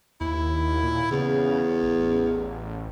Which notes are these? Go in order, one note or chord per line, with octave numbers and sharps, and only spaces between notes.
D#2 E4
A#2
E2 C#3
A1